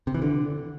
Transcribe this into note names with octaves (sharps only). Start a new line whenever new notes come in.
C3
E3
D3